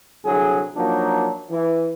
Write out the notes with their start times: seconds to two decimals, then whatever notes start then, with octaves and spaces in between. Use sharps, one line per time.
0.25 C2 D3 F#3 G#4
0.76 F3 F#3 A#3 D4 D#4
1.51 E3